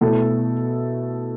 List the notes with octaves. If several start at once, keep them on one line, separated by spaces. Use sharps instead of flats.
B2 A3 E4 A4